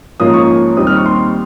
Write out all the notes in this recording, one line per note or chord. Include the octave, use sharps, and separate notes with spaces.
G#2 F3 A#3 C#4 F4 D#6
C#6
D#2 D#3 G3 C4 D#4 D#6
F6
C#6
C6